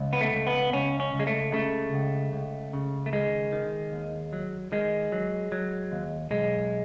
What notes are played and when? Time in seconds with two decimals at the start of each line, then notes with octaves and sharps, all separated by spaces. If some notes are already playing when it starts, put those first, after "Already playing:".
Already playing: C#2
0.13 B3
0.21 A3
0.33 C#2
0.47 B3
0.73 C#2 C#4
1.00 C#4
1.13 C#2
1.20 G#3
1.27 A3
1.53 C#3 A3
1.93 C#2
2.33 C#2
2.73 C#3
3.06 A3
3.13 D#3 G#3
3.52 D#3
3.92 D#2
4.33 F#3
4.72 D#3 G#3
5.12 F#3
5.52 F#3
5.92 D#2
6.31 B1 G#3